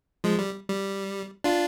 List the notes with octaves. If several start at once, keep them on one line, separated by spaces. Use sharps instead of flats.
F3 G#3
G3
G3
D4 F4